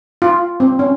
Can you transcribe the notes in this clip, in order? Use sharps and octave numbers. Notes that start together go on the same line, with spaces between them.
F4
C4
C#4